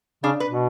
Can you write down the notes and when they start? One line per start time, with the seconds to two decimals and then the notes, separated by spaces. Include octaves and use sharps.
0.24 C#3 D4
0.40 B4
0.50 B2